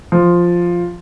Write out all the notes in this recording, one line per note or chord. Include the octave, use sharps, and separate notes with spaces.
F3